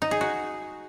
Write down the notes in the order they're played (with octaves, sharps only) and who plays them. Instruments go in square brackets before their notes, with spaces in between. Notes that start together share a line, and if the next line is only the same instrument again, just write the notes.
[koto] D#4
G#4
F#4